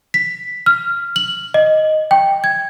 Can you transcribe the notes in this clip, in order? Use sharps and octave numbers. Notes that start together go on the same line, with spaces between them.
B6
F6
F#7
D#5
G5
G#6